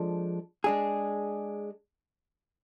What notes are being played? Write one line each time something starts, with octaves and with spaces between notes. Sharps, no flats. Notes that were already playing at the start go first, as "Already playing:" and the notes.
Already playing: F3 G#3 D4 A4
G#3 D4 G#4